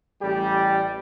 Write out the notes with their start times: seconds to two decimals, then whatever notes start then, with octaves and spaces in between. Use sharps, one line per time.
0.22 A1 G3 G4